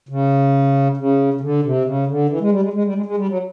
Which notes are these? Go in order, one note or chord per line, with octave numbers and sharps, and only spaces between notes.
C#3
C#3
C#3
D3
C3
C#3
D3
E3
G#3
G3
G#3
G#3
G3
G#3
G#3
G3
F#3